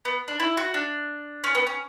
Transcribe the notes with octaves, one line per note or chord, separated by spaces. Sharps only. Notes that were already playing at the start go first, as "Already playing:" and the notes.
B3
D4
E4
F#4
D4
C#4
B3
C#4